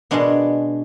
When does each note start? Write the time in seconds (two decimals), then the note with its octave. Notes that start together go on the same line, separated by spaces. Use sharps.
0.11 B2 G#3 B3 D4